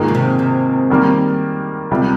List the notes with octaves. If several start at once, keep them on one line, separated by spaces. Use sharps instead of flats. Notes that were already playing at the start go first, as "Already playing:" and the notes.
Already playing: G#2 D#3 A#3 F4 G#4
C#3
C3
C3
D#3 G3 A#3
C#2 C3 G3